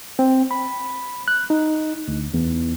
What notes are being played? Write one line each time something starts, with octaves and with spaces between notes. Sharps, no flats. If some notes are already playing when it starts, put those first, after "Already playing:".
C4
B5
F#6
D#4
D2
E2